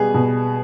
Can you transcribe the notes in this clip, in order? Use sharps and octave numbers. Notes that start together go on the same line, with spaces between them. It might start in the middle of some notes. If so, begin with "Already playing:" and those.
Already playing: B2 G3 B3 G#4
B2